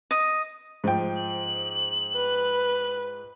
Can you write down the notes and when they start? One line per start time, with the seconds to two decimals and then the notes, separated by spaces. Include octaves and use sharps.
0.11 D#5
0.84 G#2 F3 G5
1.16 F#7
2.16 B4